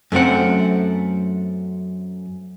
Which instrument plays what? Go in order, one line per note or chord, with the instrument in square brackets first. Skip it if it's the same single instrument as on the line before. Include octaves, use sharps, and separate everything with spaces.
[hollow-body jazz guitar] F#2 A3 C4 F#5